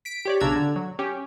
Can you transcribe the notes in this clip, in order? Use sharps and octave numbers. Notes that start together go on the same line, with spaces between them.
B6 D7
G4 C#5 D5
B1 C#3 D4 A#5 E6 G#6
D3
F#3
C#4 G4